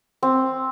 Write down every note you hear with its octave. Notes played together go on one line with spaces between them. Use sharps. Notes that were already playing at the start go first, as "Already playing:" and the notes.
C4